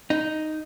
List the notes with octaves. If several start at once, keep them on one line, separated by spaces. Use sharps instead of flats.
D#4